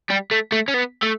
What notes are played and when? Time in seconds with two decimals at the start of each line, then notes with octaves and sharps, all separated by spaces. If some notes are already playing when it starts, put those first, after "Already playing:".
0.10 G3
0.31 A3
0.52 A3
0.68 C#4
0.74 B3
1.03 A3